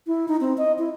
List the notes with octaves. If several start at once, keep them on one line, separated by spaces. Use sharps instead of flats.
E4
D#4
C4
D#5
E4